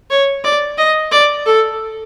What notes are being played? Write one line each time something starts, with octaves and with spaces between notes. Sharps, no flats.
C#5
D5
D#5
D5
A4